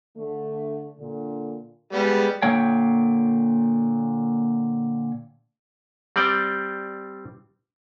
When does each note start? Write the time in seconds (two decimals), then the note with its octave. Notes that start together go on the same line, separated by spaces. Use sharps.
0.16 D3 A3
0.98 A#2 D3
1.93 G3 G#3 B3
2.42 A#2 D3 A#3 C#5 G5
6.16 G3 C4 D5 G5